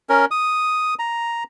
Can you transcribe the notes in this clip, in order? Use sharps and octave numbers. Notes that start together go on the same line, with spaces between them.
C#4 A#4
D#6
A#5